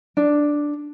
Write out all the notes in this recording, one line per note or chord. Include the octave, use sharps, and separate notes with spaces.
D4